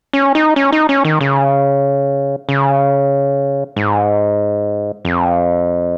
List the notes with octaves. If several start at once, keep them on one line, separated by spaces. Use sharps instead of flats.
C#4
D#4
C#4
D#4
C#4
D#3
C#3
C#3
G#2
F2